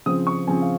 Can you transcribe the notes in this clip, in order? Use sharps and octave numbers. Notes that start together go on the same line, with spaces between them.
C#3 F3 C4 D#6
C#6
C#3 F3 C4 G#5
F5